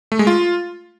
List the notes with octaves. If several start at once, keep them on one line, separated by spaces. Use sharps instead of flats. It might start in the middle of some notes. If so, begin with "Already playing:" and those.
A3
G#3
F4